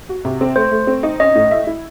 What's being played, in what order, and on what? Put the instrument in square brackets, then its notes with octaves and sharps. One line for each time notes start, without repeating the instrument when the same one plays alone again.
[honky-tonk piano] F#4
C3
C4
[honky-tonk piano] A3 [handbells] C5
[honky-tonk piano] A3
C4
D#4
[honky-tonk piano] C#4 [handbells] D#5
[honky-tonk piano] A2
E5
E4